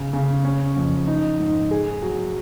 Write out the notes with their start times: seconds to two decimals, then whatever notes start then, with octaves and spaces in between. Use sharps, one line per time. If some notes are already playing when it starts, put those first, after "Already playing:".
Already playing: C#3
0.13 C#3
0.45 C#4
0.77 F2
1.07 D#4
1.39 G#2
1.71 G#4
2.03 F#3